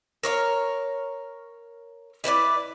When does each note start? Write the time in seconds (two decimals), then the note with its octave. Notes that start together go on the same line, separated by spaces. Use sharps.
0.23 A#4 C#5 F5
2.24 E4 B4 C5 D5